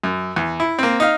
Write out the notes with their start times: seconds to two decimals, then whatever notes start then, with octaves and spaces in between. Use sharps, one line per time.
0.04 F#2
0.36 E2
0.60 E4
0.79 A#3 C4
1.00 D#4 F5